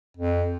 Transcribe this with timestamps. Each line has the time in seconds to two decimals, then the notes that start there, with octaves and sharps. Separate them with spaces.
0.17 F2